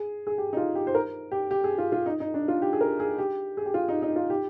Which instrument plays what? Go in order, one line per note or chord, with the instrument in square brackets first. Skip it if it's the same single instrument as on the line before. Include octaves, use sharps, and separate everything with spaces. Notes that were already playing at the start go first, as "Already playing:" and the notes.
Already playing: [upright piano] G#4
G#4
G4
D#4
F4
G4
C5
A#4
G4
G4
G#4
F4
F4
D#4
D#4
D4
F4
G4
G#4
A#4
G#4
G4
G#4
G4
F4
D#4
D#4
F4
G4